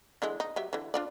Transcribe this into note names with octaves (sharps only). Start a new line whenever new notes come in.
D3 E3 G#3
D#4
F#3 G4 E5
D3 E3
D4 F4 D5